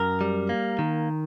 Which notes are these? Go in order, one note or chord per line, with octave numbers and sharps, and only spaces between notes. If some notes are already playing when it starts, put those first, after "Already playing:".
Already playing: F#2 A#4
G3
A#3
D#3